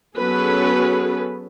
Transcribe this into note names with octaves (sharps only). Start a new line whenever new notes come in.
F#3 B3 C#4 G#4 A4 B4